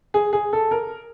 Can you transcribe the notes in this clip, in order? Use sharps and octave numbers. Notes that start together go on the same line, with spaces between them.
G#4
G#4
A4
A#4